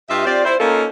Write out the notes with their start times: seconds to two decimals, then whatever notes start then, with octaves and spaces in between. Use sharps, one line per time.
0.09 G2 F4 G4 D#5 E5
0.26 C4 F4 G4 C5 D5
0.45 E4 C5
0.60 A#3 C#4 D#4 F4 A4 A#4